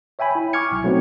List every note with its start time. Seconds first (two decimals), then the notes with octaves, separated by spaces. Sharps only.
0.19 C#5 E5 G5 G#5 B5
0.35 E4
0.53 C#6 D6 F6 G#6 C#7
0.72 B1
0.84 F#3 A3 B3 C4 D#4